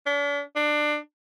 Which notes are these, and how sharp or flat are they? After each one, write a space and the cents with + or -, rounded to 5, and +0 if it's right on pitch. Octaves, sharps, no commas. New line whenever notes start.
D4 -45
D4 +20